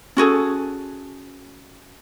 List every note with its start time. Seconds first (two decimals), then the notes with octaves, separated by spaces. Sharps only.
0.17 C#4 F#4 G#4 A4